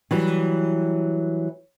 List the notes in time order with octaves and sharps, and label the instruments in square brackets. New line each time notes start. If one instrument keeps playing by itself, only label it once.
[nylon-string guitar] E3 F#3 G3